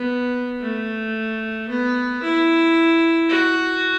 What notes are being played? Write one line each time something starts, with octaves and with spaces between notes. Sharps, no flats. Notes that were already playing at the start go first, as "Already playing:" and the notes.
Already playing: B3
A3
B3
E4
F#4